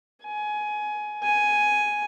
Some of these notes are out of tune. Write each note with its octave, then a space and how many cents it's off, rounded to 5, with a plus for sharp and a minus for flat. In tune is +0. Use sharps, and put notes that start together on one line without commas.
G#5 +20
G#5 +5